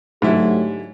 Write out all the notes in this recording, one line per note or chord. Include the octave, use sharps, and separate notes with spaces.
G#2 D3 F#3 A3 E4 G4